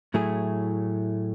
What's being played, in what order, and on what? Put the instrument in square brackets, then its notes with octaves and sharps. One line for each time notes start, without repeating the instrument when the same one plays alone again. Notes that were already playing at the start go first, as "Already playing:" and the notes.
[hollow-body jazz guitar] A2 F#3 A3 E4 G#4